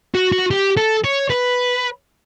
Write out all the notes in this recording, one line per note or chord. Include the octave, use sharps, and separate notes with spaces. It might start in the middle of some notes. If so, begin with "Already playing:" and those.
F#4
F#4
G4
A4
C#5
B4